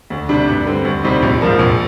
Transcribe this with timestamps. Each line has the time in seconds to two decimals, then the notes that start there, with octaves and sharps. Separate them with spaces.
0.10 D2
0.29 C3 G3 D4
0.48 G2
0.66 D3 G3 C4
0.85 D2
1.03 C3 G3 C4 D#4
1.22 A#1
1.41 G#2 F3 A#3
1.59 A#1